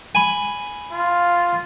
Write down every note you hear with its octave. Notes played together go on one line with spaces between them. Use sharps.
G#5 B5
F4